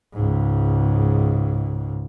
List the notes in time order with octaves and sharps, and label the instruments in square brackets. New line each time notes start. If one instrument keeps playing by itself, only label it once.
[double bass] C#2 G#2